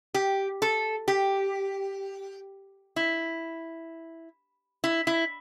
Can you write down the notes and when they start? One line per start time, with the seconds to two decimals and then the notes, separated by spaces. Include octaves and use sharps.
0.14 G4
0.62 A4
1.08 G4
2.96 E4
4.84 E4
5.07 E4